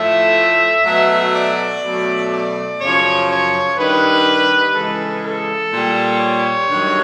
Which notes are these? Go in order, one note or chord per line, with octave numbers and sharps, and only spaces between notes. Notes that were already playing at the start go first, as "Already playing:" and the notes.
Already playing: A2 F3 A3 E5
B2 F#3 A3
D5
B2 F#3 A3
D5
F#2 C#3 F3 C#5
C#5
G2 D#3 G3 B4
C#3 E3 G#3 A4
A4
A#2 G3
C#5
G2 D#3 F#3 A3